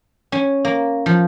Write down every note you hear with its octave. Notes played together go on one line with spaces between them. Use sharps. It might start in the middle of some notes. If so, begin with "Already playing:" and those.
C#4
A#3
F3